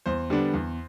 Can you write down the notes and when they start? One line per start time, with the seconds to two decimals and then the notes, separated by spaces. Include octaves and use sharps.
0.06 E2 C5
0.30 D3 G3 B3 D4
0.53 E2